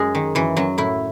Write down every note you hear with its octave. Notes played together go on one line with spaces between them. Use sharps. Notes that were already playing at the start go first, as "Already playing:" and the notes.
Already playing: F#2 G#3
D#3
F#2 E3
F#2 F#3
A2 E4